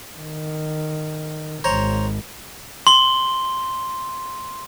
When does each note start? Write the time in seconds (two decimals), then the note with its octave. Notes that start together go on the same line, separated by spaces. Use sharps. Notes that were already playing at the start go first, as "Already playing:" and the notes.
0.17 D#3
1.64 G#1 C5 C#5 A#5
2.87 C6 G7